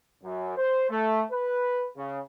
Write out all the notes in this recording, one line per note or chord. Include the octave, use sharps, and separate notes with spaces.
F#2
C5
A3
B4
C#3